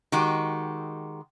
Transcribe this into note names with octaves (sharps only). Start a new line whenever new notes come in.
D#3 G#3 F#4 G4